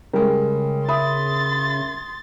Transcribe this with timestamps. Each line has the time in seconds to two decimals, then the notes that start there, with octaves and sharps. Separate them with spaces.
0.14 C#3 G3 G#3 A#4
0.89 E5 B5 C6 D#6 A6